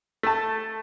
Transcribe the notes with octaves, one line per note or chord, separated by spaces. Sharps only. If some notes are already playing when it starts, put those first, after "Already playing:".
A3 A5